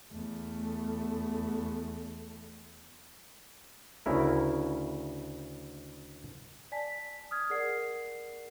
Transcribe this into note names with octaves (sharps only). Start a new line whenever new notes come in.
E2 A3
D2 C#3 E4 A#4
D5 G#5 A5 B6
D#6 F6 G#6
G#4 A#4 D5 F#5 C7